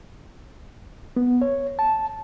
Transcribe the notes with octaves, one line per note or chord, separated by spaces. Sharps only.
B3
C#5
A5